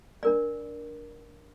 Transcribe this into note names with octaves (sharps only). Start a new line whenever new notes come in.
D4 A#4 D5